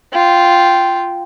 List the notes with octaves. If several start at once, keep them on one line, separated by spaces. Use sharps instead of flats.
F4 G5